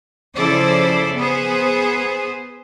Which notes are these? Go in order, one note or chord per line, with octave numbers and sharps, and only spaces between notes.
C#3 F3 E4 A4 C5 D5
B3 G#4 C5